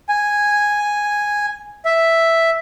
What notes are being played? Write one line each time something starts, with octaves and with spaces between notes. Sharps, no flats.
G#5
E5